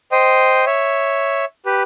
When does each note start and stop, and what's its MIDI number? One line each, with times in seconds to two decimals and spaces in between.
0.12 0.65 72
0.12 0.65 75
0.12 0.65 79
0.66 1.45 73
0.66 1.45 76
1.66 1.83 67
1.66 1.83 71